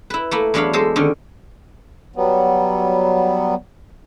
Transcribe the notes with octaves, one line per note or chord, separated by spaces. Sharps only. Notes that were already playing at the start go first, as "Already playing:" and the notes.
E4 B4
A3 A#3 E4
E2 F#3 D4 C#5 F5 B5
G#3 A4 C5
D3 D#3 C#4
F#3 G3 B3